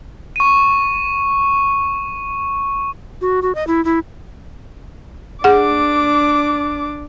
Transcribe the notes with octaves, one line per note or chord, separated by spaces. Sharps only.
C#6 D#7
F#4
F#4
D#5
E4
E4
D4 G#4 F#5 D6